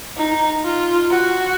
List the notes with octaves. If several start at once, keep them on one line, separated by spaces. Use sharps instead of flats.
D#4
F4
F#4